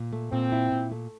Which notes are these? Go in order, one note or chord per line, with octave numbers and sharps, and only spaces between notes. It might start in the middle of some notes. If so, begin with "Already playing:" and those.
Already playing: A#2
A3
A#2 C4
E4
A#2
A3